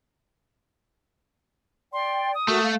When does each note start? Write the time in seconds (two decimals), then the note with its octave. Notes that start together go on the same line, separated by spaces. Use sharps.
1.93 D5 G5 C6
2.35 D#6
2.48 A3 F#4 A#4
2.63 F5